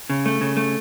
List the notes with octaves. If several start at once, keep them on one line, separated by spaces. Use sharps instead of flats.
C#3
A3
C#3
A3